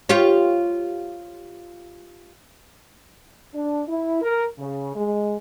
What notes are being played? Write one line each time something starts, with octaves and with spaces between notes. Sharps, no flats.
F4 G4 C#5
D4
E4
A#4
C#3
G#3